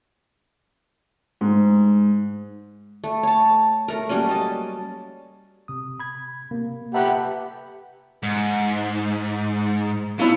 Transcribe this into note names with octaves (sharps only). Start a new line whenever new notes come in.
G#2
A3
C#5 A5
A3 A#4
F#3 G3 A#3 C#4
D#5 A5
C3 D#6
B5 G#6
C3 A#3
G4 B4 E5 F#5 A5 A#5
G#2
B2 E4 F5